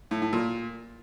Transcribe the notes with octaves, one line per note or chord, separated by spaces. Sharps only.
A2
A2
A#2